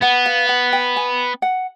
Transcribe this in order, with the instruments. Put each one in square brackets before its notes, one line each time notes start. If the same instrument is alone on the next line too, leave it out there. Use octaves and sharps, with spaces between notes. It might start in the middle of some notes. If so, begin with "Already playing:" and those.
[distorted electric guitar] B3 [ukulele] F#5
[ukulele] F5
F#5
G5
G#5
F#5